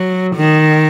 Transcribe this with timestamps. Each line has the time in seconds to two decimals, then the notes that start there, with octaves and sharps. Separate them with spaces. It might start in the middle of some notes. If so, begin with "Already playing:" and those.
Already playing: F#3
0.36 D#3